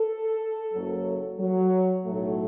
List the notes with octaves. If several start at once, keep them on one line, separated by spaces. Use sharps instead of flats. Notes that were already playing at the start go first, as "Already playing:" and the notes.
Already playing: A4
F#1 F#2 F#3
F#3
B1 A2 F#3 A3